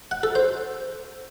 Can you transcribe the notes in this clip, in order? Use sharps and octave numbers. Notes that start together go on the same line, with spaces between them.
F#5
A4
C5